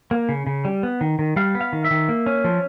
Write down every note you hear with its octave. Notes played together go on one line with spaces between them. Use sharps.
A#3
C#3
C#3
G3
B3
D#3
D#3
G3 F5
B3
F5
D#3
E5
D#3
A#3
C#4
F3